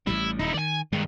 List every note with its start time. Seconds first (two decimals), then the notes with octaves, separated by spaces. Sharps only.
0.07 A1 A2 G3 E4
0.39 D#1 D#4 E4
0.54 D#3 D5 G#5
0.93 G2 D#3 G#3